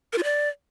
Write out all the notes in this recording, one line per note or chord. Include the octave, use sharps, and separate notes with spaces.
A#4
F4
D5